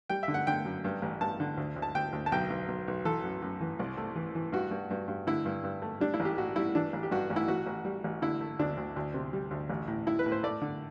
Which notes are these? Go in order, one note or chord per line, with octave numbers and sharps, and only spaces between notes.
G3 G5
E5
D3
F#5
D3 G5
F#2
G2
A1
G2 A5
D3
D2
D2
A5
D2 G5
D2
A5
B1 G5
B1
B1
B1
E3 A4
F#2
F#2
E3
C2
A3
E3
E3
G2 F#4
G2
G2
G2
D3 E4
G2
G2
A3
G3 D4
E4
A1
G4
A2 F#4
G3 E4
E3 D4
A1
G4
G2 F#4
A1
E4
A1 F#4
A1
G3
A1
D3 E4
A3
D2 D4
D2
D2
C3
G3
D2
A1
A2
A2 E4
B4
A2
C5
A3 D5
D3